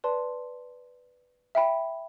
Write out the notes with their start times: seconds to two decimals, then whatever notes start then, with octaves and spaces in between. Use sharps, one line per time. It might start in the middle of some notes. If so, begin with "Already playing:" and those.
0.04 B4 D5 A5 C6
1.55 E5 G5 B5